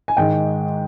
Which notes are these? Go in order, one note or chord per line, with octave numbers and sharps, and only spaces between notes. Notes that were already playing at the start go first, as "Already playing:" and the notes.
G#5
G#2 D#3 G#3 G5